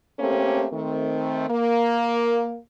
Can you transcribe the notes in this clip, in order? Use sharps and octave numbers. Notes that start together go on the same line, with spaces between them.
A3 A#3 C4 C#4 G4 A4
D#3 A3 C4
A#3